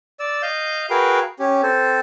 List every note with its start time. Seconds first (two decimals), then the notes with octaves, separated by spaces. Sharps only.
0.20 D5 E6
0.43 D#5 F5 G6
0.90 F#4 G#4 A#4 B4 F5 G5
1.39 C#4 G4
1.63 C4 A4 C5